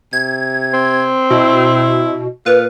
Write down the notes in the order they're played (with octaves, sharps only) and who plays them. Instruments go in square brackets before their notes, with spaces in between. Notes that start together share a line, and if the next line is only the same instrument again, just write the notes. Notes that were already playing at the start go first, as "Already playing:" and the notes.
[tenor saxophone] C3 [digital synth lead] G#6
[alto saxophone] C4
[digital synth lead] B2 [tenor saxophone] E4
[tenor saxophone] A#2 [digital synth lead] B4 [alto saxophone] F5